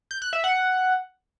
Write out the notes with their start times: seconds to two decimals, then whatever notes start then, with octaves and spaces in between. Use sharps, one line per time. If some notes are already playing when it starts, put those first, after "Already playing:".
0.11 G6
0.22 F#6
0.33 E5
0.44 F#5